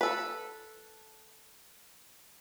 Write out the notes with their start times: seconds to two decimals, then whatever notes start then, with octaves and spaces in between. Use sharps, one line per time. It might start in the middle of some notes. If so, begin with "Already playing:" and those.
0.01 A4 B4